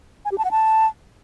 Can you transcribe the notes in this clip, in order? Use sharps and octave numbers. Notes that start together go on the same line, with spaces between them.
G#5
G4
A5
F#5
A5